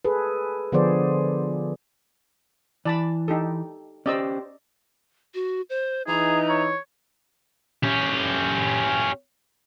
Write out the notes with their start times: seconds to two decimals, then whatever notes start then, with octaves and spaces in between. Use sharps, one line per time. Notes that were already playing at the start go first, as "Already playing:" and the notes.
0.05 G#4 A4 B4
0.72 D3 F3 B3 G#4 C5 D5
2.85 E3 D5 A5 B5
3.28 D#4 G4 A4
4.06 C#4 G4 C5 D5 D#5 E6
5.34 F#4
5.70 C5
6.07 E3 D#4 G#4 A#5
6.49 C#5
7.83 C#4 G4